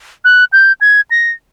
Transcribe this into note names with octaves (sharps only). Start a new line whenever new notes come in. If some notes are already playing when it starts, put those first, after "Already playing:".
F#6
G6
G#6
A#6